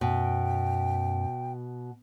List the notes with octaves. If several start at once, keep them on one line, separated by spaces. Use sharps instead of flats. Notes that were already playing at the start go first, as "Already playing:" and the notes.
F#2 B2 G5